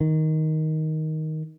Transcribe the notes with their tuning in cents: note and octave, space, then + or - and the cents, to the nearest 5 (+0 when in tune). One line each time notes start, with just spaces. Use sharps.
D#3 +10